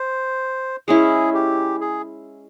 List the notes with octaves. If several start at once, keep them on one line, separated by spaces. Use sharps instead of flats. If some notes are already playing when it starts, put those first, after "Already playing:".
Already playing: C5
G#3 C#4 E4 G#4
G4
G#4